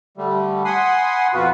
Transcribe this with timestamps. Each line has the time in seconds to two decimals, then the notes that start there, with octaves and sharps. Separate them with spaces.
0.18 D3 G3 A3
0.65 F#5 G#5 B5 C6 D#6
1.34 F2 B2 F4 F#4 B4